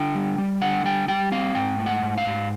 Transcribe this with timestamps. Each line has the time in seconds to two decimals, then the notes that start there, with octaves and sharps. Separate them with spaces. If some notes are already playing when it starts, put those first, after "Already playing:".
Already playing: D3 G5
0.15 G3
0.38 G3
0.61 D3 F#5
0.84 G3 G5
1.08 G3 G5
1.32 C4 F5
1.55 G#2 G5
1.79 A3
1.86 F#5
2.02 G#2
2.18 F5
2.25 G#2